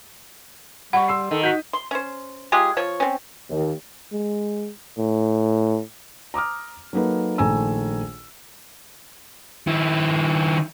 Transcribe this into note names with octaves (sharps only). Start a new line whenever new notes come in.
G3 F#5 B5 C#6
C6 E6 C7
D#3 A4
F#4 G6 B6
C6
C#4 C5
G#3 F4 G4 G#4
F3 C#5
C4 C#4
D#2
G#3
A2
A#5 D6 D#6 F6
F#3 A#3 D#4 A4 B4
A#1 D#3 A3 G#5 A#5 E6
D#3 E4